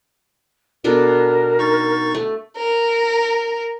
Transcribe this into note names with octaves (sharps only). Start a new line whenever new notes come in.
B2 D4 A4 A#4
D#4 C#6 A6
A3
A#4